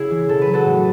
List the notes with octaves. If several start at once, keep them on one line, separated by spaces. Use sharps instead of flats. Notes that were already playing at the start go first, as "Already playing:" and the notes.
Already playing: C#3 E4 G#4
E3
B2 A4
B4
F#3
F#4 A4
A2